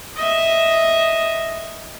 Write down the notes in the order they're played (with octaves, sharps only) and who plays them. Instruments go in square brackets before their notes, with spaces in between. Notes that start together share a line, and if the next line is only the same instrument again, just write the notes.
[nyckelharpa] D#5 E5